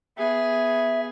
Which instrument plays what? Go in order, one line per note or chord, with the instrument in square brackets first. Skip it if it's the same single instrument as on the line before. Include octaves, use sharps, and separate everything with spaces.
[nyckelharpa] B3 G#4 [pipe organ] E5